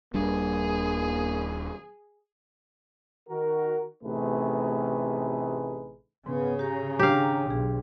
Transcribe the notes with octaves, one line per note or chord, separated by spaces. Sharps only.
D#1 G3 A#3 D4 G#4
D#3 F#4 A#4
A1 C3 A3 D#4 G#4 B4
G#2 C#3 B3
G4 C#5 A#5
D#3 D4 G4 F5
B1 G#4